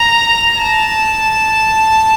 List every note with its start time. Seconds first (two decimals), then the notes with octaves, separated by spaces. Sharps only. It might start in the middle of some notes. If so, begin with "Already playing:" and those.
Already playing: A#5
0.59 A5